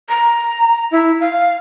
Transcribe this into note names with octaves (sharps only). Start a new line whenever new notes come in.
A#5
E4
F5